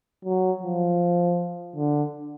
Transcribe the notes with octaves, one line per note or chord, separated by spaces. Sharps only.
F#3
F3
D3